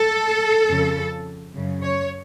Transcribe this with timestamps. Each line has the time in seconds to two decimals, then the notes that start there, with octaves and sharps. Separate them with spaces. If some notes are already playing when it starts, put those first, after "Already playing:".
Already playing: A4
0.67 F2 C#3
1.54 F#2 C#3
1.83 C#5